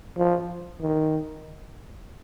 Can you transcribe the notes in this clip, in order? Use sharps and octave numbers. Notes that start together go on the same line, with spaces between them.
F3
D#3